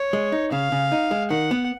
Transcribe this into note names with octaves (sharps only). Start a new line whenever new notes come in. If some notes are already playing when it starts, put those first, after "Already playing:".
Already playing: C#5
G#3
D#4
C#3 F5
C#3
D#4
G#3
D#3 F#5
B3